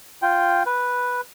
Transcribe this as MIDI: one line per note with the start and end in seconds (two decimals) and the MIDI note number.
0.22 0.63 65
0.22 0.63 79
0.66 1.21 71